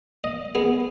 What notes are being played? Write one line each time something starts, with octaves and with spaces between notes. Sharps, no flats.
D#5
B3 G#4